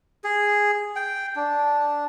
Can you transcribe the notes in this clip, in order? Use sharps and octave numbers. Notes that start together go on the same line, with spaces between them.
G#4
G5
D4